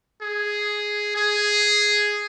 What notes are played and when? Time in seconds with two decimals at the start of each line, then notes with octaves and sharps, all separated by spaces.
0.22 G#4
1.16 G#4